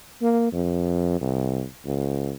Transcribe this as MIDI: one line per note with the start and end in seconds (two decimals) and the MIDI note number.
0.22 0.49 58
0.53 1.19 41
1.21 1.63 36
1.86 2.32 37